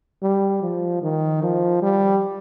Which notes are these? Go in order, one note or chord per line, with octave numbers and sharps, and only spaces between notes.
G3
F3
D#3
F3
G3